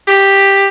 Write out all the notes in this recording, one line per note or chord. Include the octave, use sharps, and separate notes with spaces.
G4